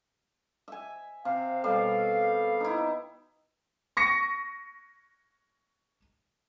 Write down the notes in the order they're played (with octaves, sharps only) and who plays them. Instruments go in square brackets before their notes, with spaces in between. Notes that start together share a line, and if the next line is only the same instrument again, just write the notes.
[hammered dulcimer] E5 G#5
[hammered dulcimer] C3 [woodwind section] F5
[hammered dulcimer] B2 G3 [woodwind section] A4 F5
[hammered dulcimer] D#4 E4
[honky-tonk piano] C#6 A#6 C#7